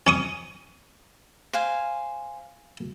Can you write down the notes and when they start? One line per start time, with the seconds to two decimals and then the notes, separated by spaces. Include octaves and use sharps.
0.07 C#4 C#6 D#6
1.53 C5 F5 G#5